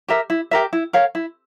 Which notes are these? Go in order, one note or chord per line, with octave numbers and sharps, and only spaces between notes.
G4 A#4 E5
E4
G4 A#4 E5
E4
A#4 C#5 F5
E4